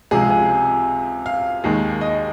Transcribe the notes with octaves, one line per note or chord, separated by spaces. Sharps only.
C#2 C3 F3 G#3 G#4
G#4
F5
D#2 D#3 G#3
D#5